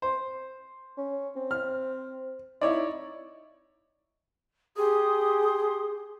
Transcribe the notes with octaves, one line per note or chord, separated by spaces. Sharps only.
C5
C#4
C4
F6
D#4 E4 C#5 D5
G4 G#4 C6 D#6